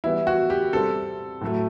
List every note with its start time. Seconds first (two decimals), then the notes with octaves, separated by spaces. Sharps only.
0.04 E3 G3 B3 E4
0.27 F#4
0.50 G4
0.73 C3 G3 C4 A4
1.41 A2 F#3 A3